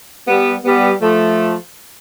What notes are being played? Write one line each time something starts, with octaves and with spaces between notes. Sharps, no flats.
G3 B3
G3 B3
F3 A3